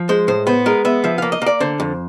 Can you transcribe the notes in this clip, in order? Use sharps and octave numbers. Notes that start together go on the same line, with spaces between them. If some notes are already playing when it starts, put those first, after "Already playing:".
Already playing: F3
G#3 C5
A2 C5
B3 C5
G#3 A#4
B3 E5
F3 E5
A#3 F5
D#5
A#3 D5
D3 C5
F2